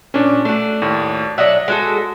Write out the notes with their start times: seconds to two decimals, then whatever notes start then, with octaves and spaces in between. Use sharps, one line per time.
0.14 A#2 C#4 D4
0.45 A3 D4 F#4
0.82 D#2 A2
1.38 F#3 D4 D#5 E5 F#5
1.68 G#3 F#4 A4